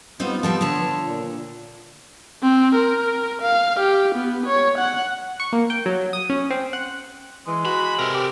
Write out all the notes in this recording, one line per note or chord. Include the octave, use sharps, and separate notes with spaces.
G3 B3 C4 D#4 F4
F3 G3 A4
D3 C#5 A5
A#2
C4
A#4
F5
G4
B3
C#5
F#5
C#6
A#3
G5
F#3
D#6
C#4
C4
F#5
E3 G#3
F#4 B5
C3 A4 A#4
G4